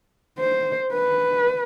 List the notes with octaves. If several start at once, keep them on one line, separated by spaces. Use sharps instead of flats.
C5
B4